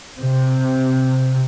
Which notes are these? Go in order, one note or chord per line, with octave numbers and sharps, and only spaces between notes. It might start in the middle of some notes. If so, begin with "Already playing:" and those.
C3